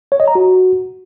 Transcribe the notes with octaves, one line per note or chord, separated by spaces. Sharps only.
C#5
D#5
A#5
F#4